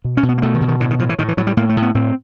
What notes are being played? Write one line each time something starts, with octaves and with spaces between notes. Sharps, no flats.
B2
C#4
B2
B3
A#3
B2 A3
D#3
B2
D#3
A2 D3
D#3
A2 F3
E3
A2 D#3
E3
A2 F#3
G3
A2 A#3
A3
A2
B3
A2 C4